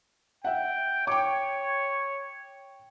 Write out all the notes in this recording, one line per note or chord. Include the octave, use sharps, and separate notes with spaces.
E5 F#5 G5
C#5 G5 D6